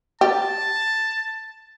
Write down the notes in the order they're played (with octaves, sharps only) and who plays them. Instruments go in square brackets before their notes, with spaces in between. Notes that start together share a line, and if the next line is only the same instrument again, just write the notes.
[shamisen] G4 [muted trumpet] A5